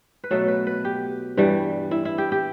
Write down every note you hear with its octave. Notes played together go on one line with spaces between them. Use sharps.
B4
B2 F#3 A3 A4
B4
B4
G4
G2 E3 G3
E4
E4
G4
G4